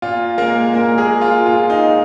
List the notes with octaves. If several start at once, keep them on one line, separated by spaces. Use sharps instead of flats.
A#2 F4
G#3 A#3 A#4
A#2 A#3 A#4
G#3 G#4
G#3
F4
A#2 F4
D#4
G#3